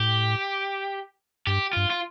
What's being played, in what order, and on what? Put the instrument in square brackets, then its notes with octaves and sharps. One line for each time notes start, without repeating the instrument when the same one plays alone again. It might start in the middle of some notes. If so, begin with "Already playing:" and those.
Already playing: [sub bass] A2 [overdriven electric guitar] G4
[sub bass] G2 [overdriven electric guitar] G4
[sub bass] G2 [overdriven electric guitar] F4
[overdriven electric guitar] F4